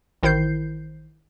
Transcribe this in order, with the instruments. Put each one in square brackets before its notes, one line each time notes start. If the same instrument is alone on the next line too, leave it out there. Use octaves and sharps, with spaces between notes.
[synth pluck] A1 D#3 E4 C5 G6 C7